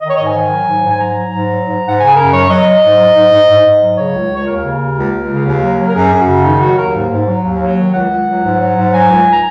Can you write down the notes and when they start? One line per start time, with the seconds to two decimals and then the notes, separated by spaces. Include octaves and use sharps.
0.01 D#3 D#5
0.09 C#5
0.16 G#2 D#5
0.26 G#5
0.35 D#3
0.50 F#3
0.67 G#2
0.83 G#2
0.90 G#5
1.00 F#3 A#5
1.16 F#3
1.34 G#2
1.50 F#3
1.67 G#2
1.82 G#2
1.88 F#5
1.99 C#3 G#5
2.07 G#4
2.16 F#2 A#4
2.33 F#3 C#5
2.48 F#3 D#5
2.66 F#3
2.82 G#2
2.99 F#3
3.14 G#2
3.31 G#2
3.48 G#2
3.64 G#2
3.81 F#3
3.97 C#3 C#5
4.14 C#2
4.31 C#2
4.36 C#5
4.46 D#2 A#4
4.63 C#3
4.79 D#2
4.97 C#2
5.13 C#2
5.29 C#3
5.45 D#2
5.62 F#3
5.79 F#3
5.89 A#4
5.95 F#2 G#4
6.12 F#2
6.20 F#4
6.28 C#3
6.44 D#3 D#4
6.61 F#3 F#4
6.78 D#2 A#4
6.95 G#2
7.10 G#2
7.28 F#3
7.44 D#2
7.61 F#3
7.77 D#3
7.93 C#2 F#5
8.10 C#2
8.27 F#3
8.43 G#2
8.59 F#3
8.75 G#2
8.93 F#3 G#5
9.09 C#2
9.31 A#5